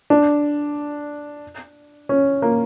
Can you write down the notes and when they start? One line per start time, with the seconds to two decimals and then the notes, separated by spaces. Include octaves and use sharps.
0.10 D4
2.09 C#4
2.42 A#3